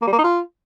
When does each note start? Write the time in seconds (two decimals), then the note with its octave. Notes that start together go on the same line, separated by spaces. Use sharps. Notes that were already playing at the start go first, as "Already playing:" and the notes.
0.02 A#3
0.07 G3
0.13 A#3
0.18 D#4
0.24 F4